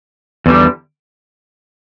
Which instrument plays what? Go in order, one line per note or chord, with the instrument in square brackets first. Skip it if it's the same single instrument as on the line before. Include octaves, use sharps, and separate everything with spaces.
[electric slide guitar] E2 D3 G3